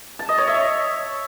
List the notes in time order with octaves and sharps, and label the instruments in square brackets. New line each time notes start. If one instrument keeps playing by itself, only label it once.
[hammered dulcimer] A5
D#5
C#5
E5